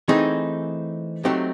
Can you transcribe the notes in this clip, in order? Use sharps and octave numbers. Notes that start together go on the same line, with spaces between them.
E3 A3 C4 D#4 G#4
F#3 A3 C4 D#4 G4